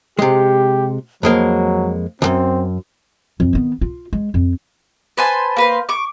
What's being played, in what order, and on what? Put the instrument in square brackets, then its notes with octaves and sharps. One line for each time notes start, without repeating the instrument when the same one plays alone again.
[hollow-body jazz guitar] C3 G#3 [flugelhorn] G4
[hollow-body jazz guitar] F2 G#3 A#3 [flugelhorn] F#3
[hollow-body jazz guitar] C#2 F#2 [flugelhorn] C4
[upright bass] F2
D#3 B3
F4
G#3
F2
[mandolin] B4 C5 G#5 A5
A#3 B4 C5
C#6 D6